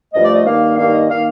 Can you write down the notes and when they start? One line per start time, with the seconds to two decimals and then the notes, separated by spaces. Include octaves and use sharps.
0.13 G2 F3 A3 D#5
0.24 D5
0.34 D#5
0.45 G2 D#3 A#3 F5
0.77 G2 D#3 A#3 F5
0.93 D#5
1.09 D#3 A#3 F5